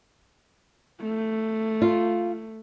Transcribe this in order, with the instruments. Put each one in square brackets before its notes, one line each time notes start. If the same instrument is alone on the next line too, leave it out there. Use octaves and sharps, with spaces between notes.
[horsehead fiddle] A3
[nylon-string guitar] F4